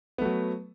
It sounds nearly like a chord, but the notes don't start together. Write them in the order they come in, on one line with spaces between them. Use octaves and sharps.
B3 A3 F#3